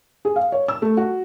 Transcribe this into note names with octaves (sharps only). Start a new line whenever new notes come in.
G#4
F5
C#5
E6
A3
F#4